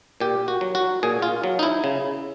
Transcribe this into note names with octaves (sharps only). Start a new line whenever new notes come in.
A#2 G4
F#4
F#3
F#4
A#2 G#4
F4
F#3
D#4
E4
C#3